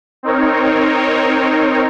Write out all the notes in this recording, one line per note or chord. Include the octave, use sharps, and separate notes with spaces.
C4 D#4 A#4 C#5